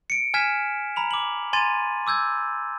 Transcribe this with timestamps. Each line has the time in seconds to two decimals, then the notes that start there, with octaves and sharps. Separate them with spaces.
0.10 C#7 D7
0.34 G#5 F6 G#6 B6 E7
0.96 A#5 B5 F7
1.11 D6 F#7
1.53 G#5 A#5 C6 G#6 A6 D#7
2.07 D6 E6 G6 G#6